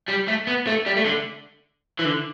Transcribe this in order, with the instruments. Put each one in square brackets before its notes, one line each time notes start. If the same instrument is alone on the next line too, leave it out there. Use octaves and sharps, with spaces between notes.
[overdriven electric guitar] G3
A3
B3
A3
G3
A3
D3
E3
D3